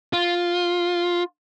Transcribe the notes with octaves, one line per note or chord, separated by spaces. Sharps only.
F4